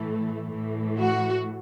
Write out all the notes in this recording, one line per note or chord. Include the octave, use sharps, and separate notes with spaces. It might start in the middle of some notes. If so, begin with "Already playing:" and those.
Already playing: A2 E3 A3
A2 E3 A3
F#4